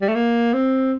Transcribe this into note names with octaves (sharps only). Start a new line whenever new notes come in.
G3
A3
A#3
C4